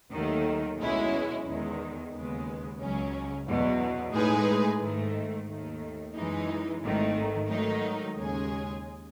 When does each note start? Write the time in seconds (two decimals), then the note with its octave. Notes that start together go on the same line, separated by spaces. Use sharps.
0.10 D#2 D#3 F#3 A3
0.78 B1 B2 G#3 C#4 E4
1.44 E2 D#3 G#3
2.11 D#2 C#3 G#3 B3
2.79 C#2 C#3 F#3 C#4
3.46 E2 B2 F#3
4.13 A2 G#3 D#4 G#4 B4
4.80 G#2 D#3 A3
5.47 D#2 D#3 A3
6.14 F#2 E3 G#3 D#4
6.82 G#1 G#2 D#3 A3
7.49 G#2 D#3 F#3 A3 D#4
8.16 D#2 C#3 G#3 C#4 G#4